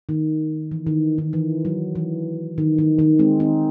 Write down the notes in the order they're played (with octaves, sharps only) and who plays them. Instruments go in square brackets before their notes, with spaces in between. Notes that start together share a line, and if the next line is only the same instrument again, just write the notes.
[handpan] D#3
E3
D#3
D#3
E3
F#3
E3
D#3
D#3
D#3
G#3 C4
C4 D#4